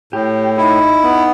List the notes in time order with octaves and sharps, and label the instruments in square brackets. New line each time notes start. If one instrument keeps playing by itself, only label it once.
[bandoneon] A2 [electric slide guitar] G4
[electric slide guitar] D#4 [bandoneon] E4
[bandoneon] B3